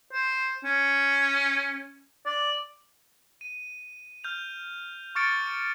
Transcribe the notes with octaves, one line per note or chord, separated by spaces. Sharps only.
C5
C#4
D5
D#7
F6 G6 F7
C#6 D6 F6 A6 C#7 D7